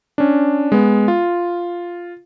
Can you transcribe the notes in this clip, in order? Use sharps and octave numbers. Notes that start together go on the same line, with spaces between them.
C#4 D4
G#3 B3
F4